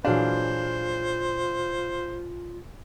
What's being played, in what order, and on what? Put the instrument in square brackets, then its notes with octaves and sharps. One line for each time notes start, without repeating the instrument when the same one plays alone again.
[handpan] A#2 G#4 F5 [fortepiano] E3 F#3 D4 [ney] F4 [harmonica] C5